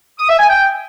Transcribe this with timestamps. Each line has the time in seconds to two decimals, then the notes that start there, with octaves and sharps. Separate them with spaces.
0.19 D#6
0.29 E5
0.39 G#5
0.49 G5